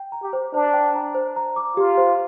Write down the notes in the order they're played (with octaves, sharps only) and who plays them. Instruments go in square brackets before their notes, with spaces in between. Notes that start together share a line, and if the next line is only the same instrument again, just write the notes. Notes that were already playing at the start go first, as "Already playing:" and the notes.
Already playing: [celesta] G5
A#5
[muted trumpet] G4
[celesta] C5
[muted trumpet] D4 [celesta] C5
[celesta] G5
A#5
C5
A#5
D6
[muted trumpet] F4 [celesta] G4
[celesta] C5